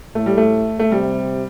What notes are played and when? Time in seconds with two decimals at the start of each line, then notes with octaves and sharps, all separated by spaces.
0.15 A2 A3
0.26 G3
0.37 A3
0.79 A3
0.91 C3 G3